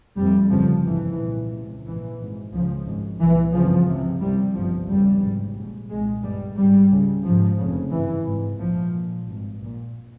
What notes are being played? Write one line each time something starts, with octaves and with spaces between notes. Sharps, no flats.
F1 F2 C3 G3
G1 F2 C#3 F3
A#1 G#2 E3
C2 A#2
C#2 C3
A#1 G#2 E3
G#1 G#2
C#2 C#3 F3
G#1 G#2
C2 A#2 E3
G1 F2 C#3 F3
C#2 C3
C2 C3 G3
G1 G2 F3
F1 E2 C#3 G3
G#1 G#2
A#1 G#2
C2 A#2 G#3
G1 G2 G3
G#1 G#2 G3
C#2 C#3
G#1 G#2 F3
F1 F2 C#3
G#1 G2 E3
G#1 G#2
A#1 G#2 F3
A#1 A#2
G#1 G2
A#1 A#2